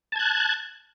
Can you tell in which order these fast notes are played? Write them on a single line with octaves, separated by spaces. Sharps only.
A5 G#6 F#6